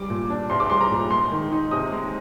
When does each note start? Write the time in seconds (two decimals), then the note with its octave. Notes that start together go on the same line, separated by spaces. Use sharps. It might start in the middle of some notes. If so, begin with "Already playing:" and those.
Already playing: G3 D6
0.10 A#2
0.30 D4
0.50 C2 C6
0.60 D6
0.70 G3 C6
0.81 A#5
0.91 A#2
1.11 G#3 C6
1.32 D#3
1.52 D#4
1.71 C3 D#6
1.92 G#3